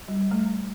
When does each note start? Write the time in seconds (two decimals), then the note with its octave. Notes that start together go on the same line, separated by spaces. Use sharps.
0.08 G3
0.31 A3